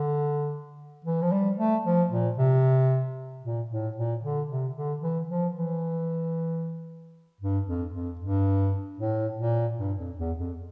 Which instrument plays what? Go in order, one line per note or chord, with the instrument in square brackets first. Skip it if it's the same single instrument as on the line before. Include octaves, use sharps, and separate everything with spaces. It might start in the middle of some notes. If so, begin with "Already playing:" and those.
Already playing: [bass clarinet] D3
E3
F3
G3
A3
F3
A#2
C3
A#2
A2
A#2
D3
C3
D3
E3
F3
E3
G2
F2
F2
G2
A2
A#2
G2
F2
E2
F2